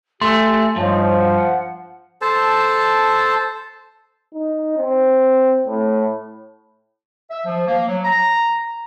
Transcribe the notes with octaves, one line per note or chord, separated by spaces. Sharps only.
A3 G4 G#5 C6 E6
G2 F3 D#4 C5 C#5
F#5
A4 C5 A5
D#4
C4
A2
E5
F3
A#3
F#3
A#5